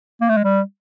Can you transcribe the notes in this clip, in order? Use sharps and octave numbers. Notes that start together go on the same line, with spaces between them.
A#3
A3
G#3
G3